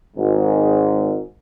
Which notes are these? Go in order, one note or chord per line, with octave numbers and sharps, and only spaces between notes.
G#1 G#2